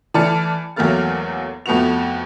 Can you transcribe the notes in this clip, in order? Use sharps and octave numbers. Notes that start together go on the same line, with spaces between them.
E3 A3 D5 A5 F6 C#7
E2 F#3 A3 A#3 F6 A6
F2 A3 B3 F#4 F7